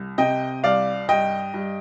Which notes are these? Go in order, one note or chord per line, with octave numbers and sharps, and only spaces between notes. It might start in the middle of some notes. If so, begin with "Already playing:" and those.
Already playing: C2
C3 D#5 G5
C2 D5 F5
G2 D#5 G5
G2